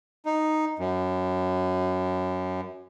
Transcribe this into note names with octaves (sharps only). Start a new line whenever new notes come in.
D#4
F#2